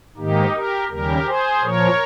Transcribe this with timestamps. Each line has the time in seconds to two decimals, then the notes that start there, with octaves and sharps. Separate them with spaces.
0.17 G#2 D#3 A#3 D#4 G4
0.53 G4 A#4
0.89 D#2 C#3 G3 A#3 G4 A#4
1.25 G#4 C5
1.61 A#2 F3 A#3 A#4 C#5